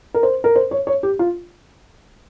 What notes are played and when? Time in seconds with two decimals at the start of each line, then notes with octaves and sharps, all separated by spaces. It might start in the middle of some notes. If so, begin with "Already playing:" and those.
0.14 A#4
0.23 C5
0.44 A#4
0.56 C5
0.71 C#5
0.87 C#5
1.03 G4
1.19 F4